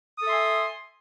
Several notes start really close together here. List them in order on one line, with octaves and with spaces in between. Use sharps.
D#6 A4 E5 C6 G#5